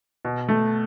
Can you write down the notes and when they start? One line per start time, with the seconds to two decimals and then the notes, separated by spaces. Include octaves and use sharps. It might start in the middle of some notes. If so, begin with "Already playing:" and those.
0.25 B2
0.49 A3